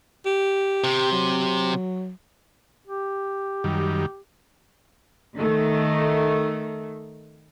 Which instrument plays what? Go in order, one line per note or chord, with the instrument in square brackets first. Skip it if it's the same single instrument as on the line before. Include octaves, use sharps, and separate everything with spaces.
[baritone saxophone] G4
[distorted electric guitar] C3
[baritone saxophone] F#3
[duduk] G4
[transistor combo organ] F#2 D#3 G3
[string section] D#3 A3